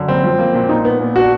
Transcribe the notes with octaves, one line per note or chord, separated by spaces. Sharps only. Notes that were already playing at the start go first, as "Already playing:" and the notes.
Already playing: F#2 D3
F#1 C4
F3
A#3
A#2
A#2 D#4
B3
A#2
D4 F#4